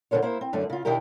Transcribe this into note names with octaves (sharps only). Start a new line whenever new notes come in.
E2 D3 A3 A#4 C5 C#5
A#3 E4 C5
C4
F#2 D3 A3
C#3 F4
B2 D#3 D4 E4 G4 A#4